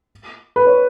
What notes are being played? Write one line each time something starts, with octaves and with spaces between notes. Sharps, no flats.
B4
C#5